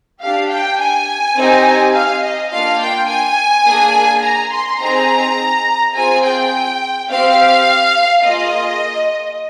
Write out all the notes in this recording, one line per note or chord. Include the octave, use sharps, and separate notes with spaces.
D4 G4 F5
G5
G#5
C4 D#4 G4
F5
D#5
A#3 D4 F4 F5
G5
G#5
A#3 D4 G#4
A#5
C6
C4 D#4 G#4 A#5
C4 F4 G#4 G#5
G5
C4 G4 F5
A#3 F4 G#4 D#5